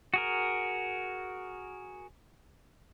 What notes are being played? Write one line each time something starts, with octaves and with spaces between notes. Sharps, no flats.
F#4 G#4 A#4